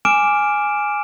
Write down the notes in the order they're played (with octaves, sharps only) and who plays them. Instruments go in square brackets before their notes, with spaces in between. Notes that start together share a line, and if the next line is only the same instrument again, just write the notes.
[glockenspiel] G#5 D6 F6 D7 E7